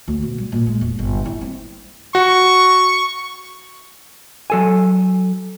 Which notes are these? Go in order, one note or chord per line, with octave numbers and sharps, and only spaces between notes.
D2
B2
G3
A#2
G#3
E1
G1
E4
C4
F#4 C#6
F#3 A4 G#5